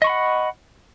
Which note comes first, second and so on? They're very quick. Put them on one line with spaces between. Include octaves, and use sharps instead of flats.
D#5 C#6 B5 F#5